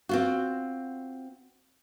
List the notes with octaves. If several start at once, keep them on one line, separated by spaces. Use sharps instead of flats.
C4 F4 F#4